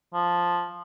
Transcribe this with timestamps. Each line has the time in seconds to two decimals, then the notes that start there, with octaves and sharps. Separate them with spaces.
0.14 F3